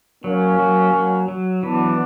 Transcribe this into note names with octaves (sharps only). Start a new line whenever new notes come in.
F#3 A#3 C#4
F#3
F#3
F#3
E3 B3 D4